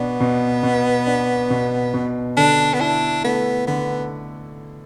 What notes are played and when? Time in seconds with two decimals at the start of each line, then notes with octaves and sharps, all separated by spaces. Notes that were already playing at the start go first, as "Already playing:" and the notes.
Already playing: B2 B3 D4
0.20 B2
0.63 B2
1.07 D4
1.50 B2
1.94 B2
2.37 D3 D4
2.73 B3
2.81 D4 E4
3.24 A3 B3
3.67 D3 B3